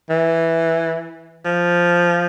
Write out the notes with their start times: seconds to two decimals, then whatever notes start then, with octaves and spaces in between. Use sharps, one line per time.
0.10 E3
1.45 F3